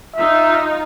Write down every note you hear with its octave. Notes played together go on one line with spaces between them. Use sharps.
D#4 F4 E5